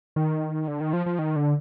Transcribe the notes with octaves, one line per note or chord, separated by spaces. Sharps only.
D#3
D3
D#3
F3
F3
D#3
D3